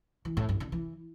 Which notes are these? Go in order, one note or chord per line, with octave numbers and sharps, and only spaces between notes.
E3
A2
G2
D3
E3